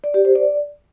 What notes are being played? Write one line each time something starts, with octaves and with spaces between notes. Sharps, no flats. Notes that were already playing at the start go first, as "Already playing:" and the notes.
D5
G4
C5
D5